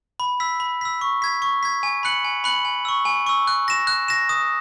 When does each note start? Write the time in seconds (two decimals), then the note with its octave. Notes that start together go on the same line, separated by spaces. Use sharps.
0.20 B5
0.40 E6 B6
0.60 B5
0.81 E6 B6
1.01 C#6
1.22 G#6 B6
1.42 C#6
1.63 G#6 B6
1.83 G#5
2.03 B5 F#6 C#7 F#7
2.24 G#5
2.44 B5 F#6 C#7 F#7
2.65 G#5
2.85 C#6 E6
3.05 G#5
3.26 C#6 E6
3.47 F#6
3.68 A#6 E7
3.87 F#6
4.08 A#6 E7
4.29 D#6